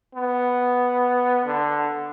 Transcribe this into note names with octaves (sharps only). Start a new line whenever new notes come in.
B3
D3